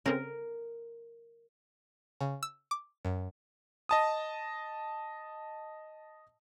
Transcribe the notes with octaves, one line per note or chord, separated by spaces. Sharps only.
C#3 C4 C#4 A#4
C#3
E6
D6
F#2
D#5 A5 D#6